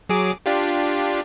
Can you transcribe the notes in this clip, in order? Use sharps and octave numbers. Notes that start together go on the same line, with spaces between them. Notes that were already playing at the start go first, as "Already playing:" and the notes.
F#3 G#4 D6
D4 F4 G4